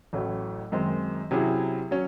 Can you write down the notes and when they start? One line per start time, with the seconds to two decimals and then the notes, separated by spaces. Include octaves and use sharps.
0.13 A1 A2 F#3 A3 C#4
0.72 F#2 D#3 G#3 C4
1.31 C3 F#3 C#4 E4 G#4
1.91 F#3 C#4